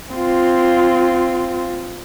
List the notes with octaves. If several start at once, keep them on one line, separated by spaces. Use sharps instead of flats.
C4 F4